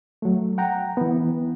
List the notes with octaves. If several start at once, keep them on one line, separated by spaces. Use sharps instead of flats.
F#3 A3
F#5 G5 A#5
E3 B3